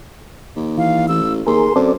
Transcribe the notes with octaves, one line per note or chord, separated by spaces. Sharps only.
D#2
E3 F5
A1 E6
D#2 G#4 A#4 C6
F#2 C4 A4 D5